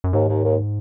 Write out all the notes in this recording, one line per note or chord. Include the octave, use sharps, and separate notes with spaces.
F#2
D#2 G#2
D#2
D#2